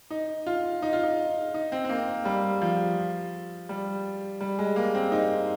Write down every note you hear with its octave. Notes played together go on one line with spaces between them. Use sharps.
D#4
F4
D#4
F4
D#4
D#4
C4
C4
A#3
G3
F3
G3
G3
G#3
A#3
C4
D#4